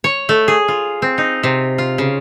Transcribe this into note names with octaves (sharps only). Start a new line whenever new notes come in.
C#5
A3
G#4
F4
C4
D#4
C3
F4
C#3